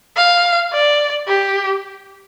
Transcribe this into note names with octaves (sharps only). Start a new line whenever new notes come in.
F5
D5
G4